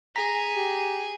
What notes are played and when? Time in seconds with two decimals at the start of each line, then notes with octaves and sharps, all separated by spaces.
0.16 G#4 A#5 A#6 B6
0.55 G4